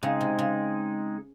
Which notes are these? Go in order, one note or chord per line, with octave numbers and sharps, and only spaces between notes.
C#3 G#3 C4 D#4 G#4
C3
C#3